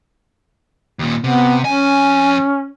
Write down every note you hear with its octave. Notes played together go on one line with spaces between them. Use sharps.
D#2 A#2
C3 B3
F2 C#4 G#5